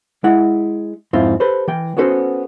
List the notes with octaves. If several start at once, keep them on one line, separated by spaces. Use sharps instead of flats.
G#3 E4 F#5
F2 G#2 C4 E4 F4
G4 A4 B4 C5
E3 G5
B3 C#4 F#4 A4 B4 C5